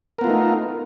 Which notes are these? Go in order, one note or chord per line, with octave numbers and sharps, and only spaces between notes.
A3 B3 D#4 F4 A#4